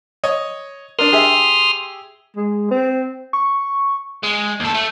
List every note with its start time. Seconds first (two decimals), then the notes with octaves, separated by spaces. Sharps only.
0.24 C#5 D#5
0.99 D4 A#4 C6 D#6 F6
1.12 G4 G#4 E5
2.36 G#3
2.71 C4
3.33 C#6
4.24 G#3
4.60 D#2 A4
4.74 A3